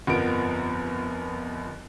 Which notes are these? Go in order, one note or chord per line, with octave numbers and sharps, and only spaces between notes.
G1 F2 F3 B3 A#4 D7